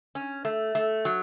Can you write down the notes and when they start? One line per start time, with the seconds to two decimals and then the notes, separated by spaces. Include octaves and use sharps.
0.15 C#4
0.45 A3
0.75 A3
1.05 F#3